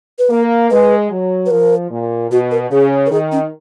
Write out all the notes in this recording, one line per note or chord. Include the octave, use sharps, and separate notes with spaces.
B4
A#3 A#4
G#3 B4
F#3
B4
F3 A#4
A#2
B2 F#4
A#4
C#3 G#4
A#4
D#3 G#4
C#4